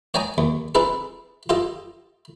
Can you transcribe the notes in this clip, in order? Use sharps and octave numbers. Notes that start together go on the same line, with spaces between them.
C#5 D5 G5 G#5 A#5 D#6
D#2
C4 D#4 G#4 A4 B4
F4 G4 A4 D#5